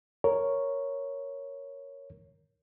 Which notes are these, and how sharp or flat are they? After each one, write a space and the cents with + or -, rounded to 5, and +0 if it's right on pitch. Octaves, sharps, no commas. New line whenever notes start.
A#4 +0 C#5 +0